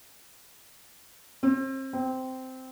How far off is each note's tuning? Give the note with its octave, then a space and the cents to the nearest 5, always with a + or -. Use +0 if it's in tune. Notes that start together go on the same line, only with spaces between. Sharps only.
C4 +35
C4 -10